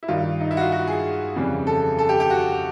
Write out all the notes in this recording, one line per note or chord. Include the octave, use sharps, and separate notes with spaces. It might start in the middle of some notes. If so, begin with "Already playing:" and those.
E4
G2 D#3 G3 F4
D#4
E4
F#4
F4
F#4
G#4
F2 C#3 E3 G3
A4
A4
G4
G4
F#4